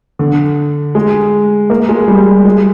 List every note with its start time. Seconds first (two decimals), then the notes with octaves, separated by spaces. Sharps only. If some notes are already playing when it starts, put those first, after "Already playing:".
0.19 D3
0.95 G#3
1.70 A#3
1.89 G#3
2.08 G3
2.45 G#3